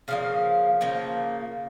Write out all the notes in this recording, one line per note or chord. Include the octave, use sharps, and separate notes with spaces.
C#3 F3 A#3 F5
C#3 F3 A#3